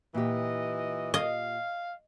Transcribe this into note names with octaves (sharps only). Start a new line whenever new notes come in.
A#2 E3 G4 D#5
D#5 F5